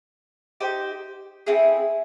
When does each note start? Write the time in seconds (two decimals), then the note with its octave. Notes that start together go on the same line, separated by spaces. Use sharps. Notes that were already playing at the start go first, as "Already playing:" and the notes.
0.60 D#4 G4 C5
1.47 A3 C4 E4 G#4